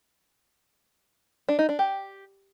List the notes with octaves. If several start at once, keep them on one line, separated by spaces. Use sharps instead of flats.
D4
D#4
D4
G4